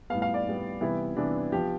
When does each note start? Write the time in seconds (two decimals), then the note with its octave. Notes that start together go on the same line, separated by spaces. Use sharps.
0.10 A2 G3 B3 F5
0.22 F5
0.34 D5
0.46 A2 G3 B3
0.81 C3 E3 G3 B3 E4
1.16 C3 E3 G3 B3 D4
1.52 F3 B3 G4